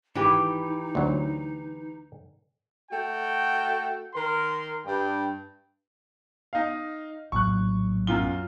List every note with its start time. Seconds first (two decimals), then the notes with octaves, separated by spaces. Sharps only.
0.15 G#1 E3 D#4 G4
0.95 D2 F#3
2.91 A3 F#4 G5
4.14 D#3 A#4 C6
4.86 G2 G5
6.53 D#4 F5
7.32 A#1 A2 F#3 C#6 F#6
8.07 F#2 F4 G7